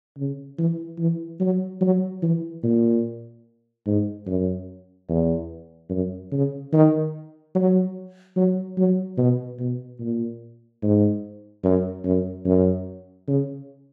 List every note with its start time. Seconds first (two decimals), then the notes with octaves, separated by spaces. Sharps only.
0.18 C#3
0.58 E3
0.99 E3
1.40 F#3
1.81 F#3
2.23 E3
2.63 A#2
3.86 G#2
4.26 F#2
5.09 E2
5.90 F#2
6.32 C#3
6.73 D#3
7.55 F#3
8.37 F#3
8.78 F#3
9.18 B2
9.59 B2
10.00 A#2
10.83 G#2
11.64 F#2
12.05 F#2
12.46 F#2
13.28 C#3